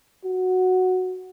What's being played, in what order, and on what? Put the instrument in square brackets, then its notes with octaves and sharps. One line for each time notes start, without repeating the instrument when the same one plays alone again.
[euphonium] F#4